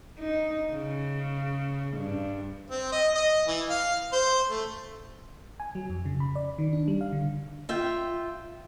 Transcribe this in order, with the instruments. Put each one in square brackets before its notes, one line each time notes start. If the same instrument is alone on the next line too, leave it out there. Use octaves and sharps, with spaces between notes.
[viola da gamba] D#4
C#3
G2
[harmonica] C4
D#5
D#5
E3
F5
C5
A3
[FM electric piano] G#5
F#3
F2
C#3
B5
D5
D#3
D4
G3
F5
D3
[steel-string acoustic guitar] F4 E5 G5